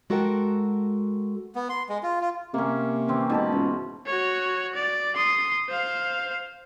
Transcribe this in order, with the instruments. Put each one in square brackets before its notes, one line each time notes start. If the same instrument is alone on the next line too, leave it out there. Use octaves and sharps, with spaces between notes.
[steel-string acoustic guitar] G#3 F#4 A4 A#4 F#5 G5
[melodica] B3
C6
G#3
F4
F4
[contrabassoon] C3 [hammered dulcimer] A#3 C#4
[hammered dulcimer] E3 C4 C#4
[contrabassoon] G#2 [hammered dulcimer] B2 A5 B5
[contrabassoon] C#2 [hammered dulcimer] G#2
[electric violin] F#4 C#5
D5
C6 D#6
C5 F5